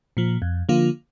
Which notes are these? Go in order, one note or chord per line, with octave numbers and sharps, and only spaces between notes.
A#2 F3
F2
D3 F3 A#3 F4